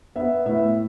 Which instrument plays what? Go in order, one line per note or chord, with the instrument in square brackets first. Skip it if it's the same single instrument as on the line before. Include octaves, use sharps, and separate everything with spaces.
[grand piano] B3 E5
A2 E5